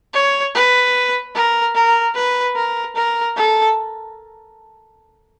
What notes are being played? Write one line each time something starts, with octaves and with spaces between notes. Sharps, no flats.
C#5
B4
A#4
A#4
B4
A#4
A#4
A4